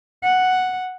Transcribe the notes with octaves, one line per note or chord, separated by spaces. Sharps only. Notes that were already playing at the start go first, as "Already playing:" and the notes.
F#5